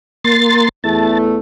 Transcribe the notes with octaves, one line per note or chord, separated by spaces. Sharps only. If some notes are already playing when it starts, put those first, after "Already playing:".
A#3 C6 A6
E2 A3 A5